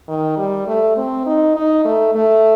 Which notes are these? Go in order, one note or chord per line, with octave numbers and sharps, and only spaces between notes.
D#3
G3
A3
C4
D#4
D#4
A3
A3